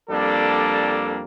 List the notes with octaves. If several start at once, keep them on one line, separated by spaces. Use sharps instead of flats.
F2 G3 A#3 D4 A4